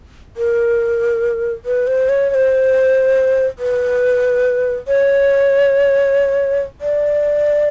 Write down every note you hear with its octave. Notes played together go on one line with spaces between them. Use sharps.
A#4
B4
C5
C#5
C#5
C5
B4
C#5
D5